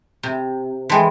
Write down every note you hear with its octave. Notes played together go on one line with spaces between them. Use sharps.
C3
E3 G#3 G5 A5 C6